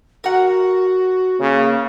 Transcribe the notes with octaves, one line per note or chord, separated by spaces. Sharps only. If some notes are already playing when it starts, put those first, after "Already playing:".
F#4 A#4 F#5
C#3 A#3